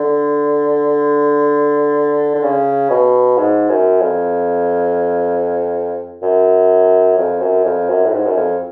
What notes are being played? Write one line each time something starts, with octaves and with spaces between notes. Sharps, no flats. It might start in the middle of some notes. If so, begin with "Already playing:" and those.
Already playing: D3
D3
C#3
B2
G#2
F#2
F2
F#2
F2
F#2
F2
F#2
A2
G#2
F#2
F2